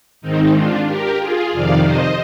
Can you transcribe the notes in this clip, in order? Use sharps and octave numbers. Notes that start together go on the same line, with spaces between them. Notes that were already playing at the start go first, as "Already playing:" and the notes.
G#2 D#3 C4 D#4
D4 F4
G4 A#4
F4 G#4
F2 C3 D#3 D5 F5
C5 D#5